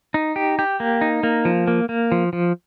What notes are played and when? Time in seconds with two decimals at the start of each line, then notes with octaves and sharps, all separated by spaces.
0.14 D#4
0.36 G4
0.59 G4
0.80 A#3
1.01 D#4
1.23 A#3
1.45 F3
1.68 A#3
1.89 A#3
2.12 F3
2.33 F3